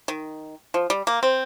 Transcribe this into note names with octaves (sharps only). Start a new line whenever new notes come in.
D#3
F3
G3
A#3
C4